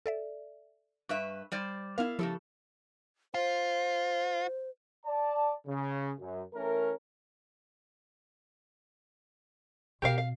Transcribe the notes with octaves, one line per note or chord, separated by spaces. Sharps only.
A4 D5 E5
G2 B4 E5 C#6
G3 C5 D5
B3 E4 A#4 F5
C#3 F3 A3 E4 G4 A4
F4 C5
D5 A5
C#3
F#2
E3 A3 C#4 A#4
B2 C4 G4 A#4 F5
F5